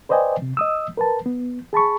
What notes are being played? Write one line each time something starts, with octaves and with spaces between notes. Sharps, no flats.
B4 C5 D5 D#5 G5 G#5
C3
D#5 D#6 E6
A#4 B4 A5
B3
G#4 A5 B5 C#6